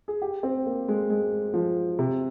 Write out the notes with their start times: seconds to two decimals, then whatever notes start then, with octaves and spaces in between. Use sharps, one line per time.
0.08 G#4
0.22 G4
0.43 C4
0.66 A#3
0.88 G#3
1.10 G#3
1.54 F3
1.99 C3